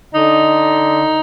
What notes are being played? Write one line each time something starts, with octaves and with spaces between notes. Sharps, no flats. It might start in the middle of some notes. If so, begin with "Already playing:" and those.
D3 D#4